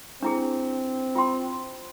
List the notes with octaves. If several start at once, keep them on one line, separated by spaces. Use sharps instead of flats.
C4 D4 E4 G#4
F4 G5 C6